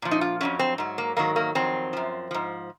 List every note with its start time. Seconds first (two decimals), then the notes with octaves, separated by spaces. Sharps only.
0.02 A#2 F3
0.11 D#4
0.21 F4
0.41 F2 D#3 F#3 C#4
0.59 C4
0.78 G#2 F#3
0.98 A#3
1.17 G#2 D#3 F#3 A#3
1.36 A#3
1.55 F2 D#3 F#3 C4
1.93 F#2 F3
2.31 G#2 F3